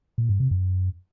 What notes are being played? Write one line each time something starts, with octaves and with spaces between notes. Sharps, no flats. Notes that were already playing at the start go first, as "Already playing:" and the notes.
A#2
G2
C3
F#2